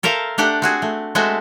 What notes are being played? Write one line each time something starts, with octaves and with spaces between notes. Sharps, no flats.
A4 A#4 C5 E5 F5
A3 D4 G4 F#5
C4 F#4 G#4
A3
G#3 A3 C4 F#4 E5